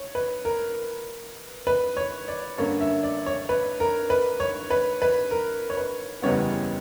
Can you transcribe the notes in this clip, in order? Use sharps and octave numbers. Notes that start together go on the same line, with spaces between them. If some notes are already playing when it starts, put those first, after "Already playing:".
Already playing: C#5
B4
A#4
B4
C#5
D5
G2 D3 A#3 C#4 C#5
E5
D5
C#5
B4
A#4
B4
C#5
B4
B4
A#4
C#5
B4
F#1 E2 C#3 G3 B3 C#5